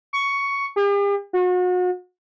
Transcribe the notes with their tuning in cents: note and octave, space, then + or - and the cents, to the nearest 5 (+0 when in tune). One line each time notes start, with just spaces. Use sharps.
C#6 +10
G4 +45
F#4 -35